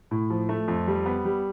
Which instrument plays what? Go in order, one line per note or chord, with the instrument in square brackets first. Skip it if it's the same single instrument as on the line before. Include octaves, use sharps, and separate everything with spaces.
[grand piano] A2
F3
A3
F2
G3
B3
G3